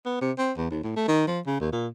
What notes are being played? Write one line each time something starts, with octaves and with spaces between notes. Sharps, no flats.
B3
C3
C4
E2
D#2
A2
A3
D#3
F3
C#3
D#2
A#2